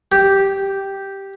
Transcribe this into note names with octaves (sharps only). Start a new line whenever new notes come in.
G4